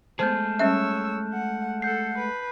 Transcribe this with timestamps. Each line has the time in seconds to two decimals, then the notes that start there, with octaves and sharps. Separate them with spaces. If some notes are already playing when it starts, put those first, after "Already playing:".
0.19 G#3 A3 B3 G#4 C5 A5 F6 G6
0.59 G3 C#4 C#5 E5 E6 F#6
1.33 F#5
1.82 A4 F#5 G6 C7
2.19 B4